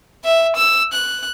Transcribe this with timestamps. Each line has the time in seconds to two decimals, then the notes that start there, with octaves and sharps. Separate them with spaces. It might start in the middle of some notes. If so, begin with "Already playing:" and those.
0.24 E5
0.56 E6
0.93 F#6